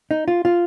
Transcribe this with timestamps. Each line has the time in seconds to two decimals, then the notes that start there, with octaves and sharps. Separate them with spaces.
0.11 D#4
0.28 F4
0.45 F4